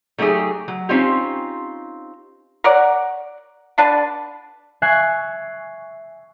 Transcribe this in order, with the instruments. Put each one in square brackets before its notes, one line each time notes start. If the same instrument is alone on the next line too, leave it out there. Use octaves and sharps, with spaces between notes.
[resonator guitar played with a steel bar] F#3 A3 D#4 G4 G#4
F#3
C4 C#4 D#4 F4 G4
[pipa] A#4 C#5 D5 F#5
D3 D4 B4 A5
[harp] E5 G#5 C#6 F#6 C7